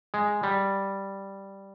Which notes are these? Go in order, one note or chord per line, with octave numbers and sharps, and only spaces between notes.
G#3
G3